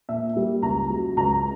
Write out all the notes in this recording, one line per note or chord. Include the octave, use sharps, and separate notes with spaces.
A#2 E5
G3 A#3
C#2 A#5
C#3 F#3
C#2 A#5